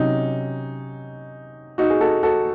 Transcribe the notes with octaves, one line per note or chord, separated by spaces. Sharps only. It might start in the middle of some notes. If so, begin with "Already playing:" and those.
Already playing: C3 F#3 C#4 D#4
D#4 F#4
G#4
F#4 A4
F#4 A4